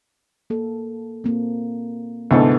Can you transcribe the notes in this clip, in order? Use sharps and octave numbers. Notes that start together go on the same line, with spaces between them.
A#3 A4
A#3 C4
D2 G#2 C3 B3 E4 A4